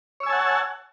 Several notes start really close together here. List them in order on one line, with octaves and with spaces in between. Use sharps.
C#5 E6 G#5 A5 F#5